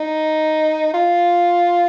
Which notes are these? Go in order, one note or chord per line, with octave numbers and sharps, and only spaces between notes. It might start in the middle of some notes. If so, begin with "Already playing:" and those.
Already playing: D#4
F4